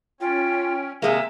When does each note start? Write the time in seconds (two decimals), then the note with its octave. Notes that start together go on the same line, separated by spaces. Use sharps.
0.21 C#4 F4 G5
1.02 C3 G#3 A#3 G#4 E5